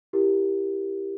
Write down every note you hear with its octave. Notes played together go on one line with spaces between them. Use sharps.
E4 G4 A#4